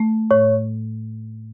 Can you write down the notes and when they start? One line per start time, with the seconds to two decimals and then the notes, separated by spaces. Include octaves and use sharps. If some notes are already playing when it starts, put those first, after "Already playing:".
Already playing: A3
0.31 A2 C#5